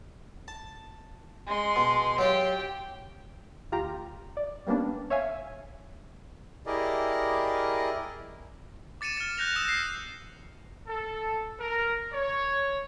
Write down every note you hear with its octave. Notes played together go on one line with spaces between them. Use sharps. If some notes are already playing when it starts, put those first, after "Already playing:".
A5
G#3 C6
B2
F#3 F4 G4 G5
D2 F4 G4 A#5
D5
G3 A#3 B3 C#4 D4
C#5 E5 F5 G#5
E4 G4 G#4 A#4 D5 D#5
D6 A6 C#7 D#7 E7
F6 A6
F#6 G6 A#6 F7
D#6 E6 A#6 E7
C7
A4
A#4
C#5